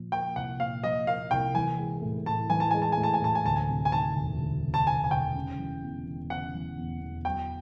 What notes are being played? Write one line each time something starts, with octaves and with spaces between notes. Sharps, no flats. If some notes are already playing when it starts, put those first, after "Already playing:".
Already playing: A#2 F3
A#3 G5
C2 F#5
A#2 F5
F3 D#5
A#3 F5
C2 G5
E3 G#5
G#3
A2
A2 A5
E3 G#5
A5
G#3 G#5
A5
G#5
A2
A5
G#5
A2 A5
G#5
D2 A5
G#5
C3
G#5
D#3 A5
E1
D2
C3
A5
D#3 G#5
G#5
E1 G5
C#3
E3
E2
E2
C#3 F#5
E3
E2
E2
F#3 G5